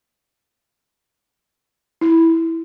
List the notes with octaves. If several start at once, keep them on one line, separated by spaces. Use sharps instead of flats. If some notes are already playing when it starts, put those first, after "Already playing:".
E4